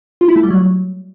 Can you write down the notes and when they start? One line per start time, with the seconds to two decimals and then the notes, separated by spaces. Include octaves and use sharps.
0.21 F4
0.28 E4
0.36 A3
0.43 G3
0.50 F#3